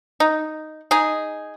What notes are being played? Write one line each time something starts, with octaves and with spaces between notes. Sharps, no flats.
D#4
D#4 G#4